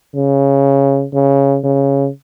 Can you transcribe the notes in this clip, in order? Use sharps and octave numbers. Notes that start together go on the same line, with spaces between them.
C#3
C#3
C#3